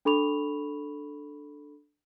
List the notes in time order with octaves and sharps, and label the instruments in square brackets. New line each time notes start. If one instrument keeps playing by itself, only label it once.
[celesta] D4 A4 B5 C#6 F7